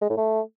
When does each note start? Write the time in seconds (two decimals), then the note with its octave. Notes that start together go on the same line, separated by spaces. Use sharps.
0.01 G#3
0.09 A2
0.17 A3